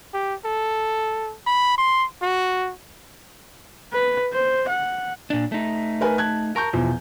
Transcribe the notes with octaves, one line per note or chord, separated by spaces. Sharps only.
G4
A4
B5
C6
F#4
B4
C5
F#5
A#2 D4
A3 D#4
A#4 B4 G#5
A5 F#6 G#6
A#4 A5 C#6 G6
E2 B2 F3